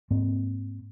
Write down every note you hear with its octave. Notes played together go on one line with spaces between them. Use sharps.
G#2 A#3 C4